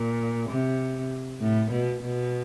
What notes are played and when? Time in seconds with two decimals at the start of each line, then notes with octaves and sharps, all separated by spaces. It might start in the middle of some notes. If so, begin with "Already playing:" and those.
Already playing: A#2
0.50 C3
1.41 A2
1.71 B2
2.02 B2